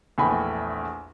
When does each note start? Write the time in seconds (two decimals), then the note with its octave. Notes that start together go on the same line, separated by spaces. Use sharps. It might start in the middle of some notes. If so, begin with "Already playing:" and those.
0.18 A#1 E2 A3 G5 G#5 B5